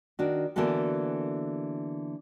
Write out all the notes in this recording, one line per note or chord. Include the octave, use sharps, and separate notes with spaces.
D#3 D4 F#4
D3 E3 A#3 B3 F#4 A4